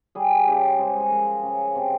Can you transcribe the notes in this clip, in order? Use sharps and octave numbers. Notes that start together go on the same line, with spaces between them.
G3 G#4
C#3 G4
G#3 C5
G#4
F3 A#4
C#3
C3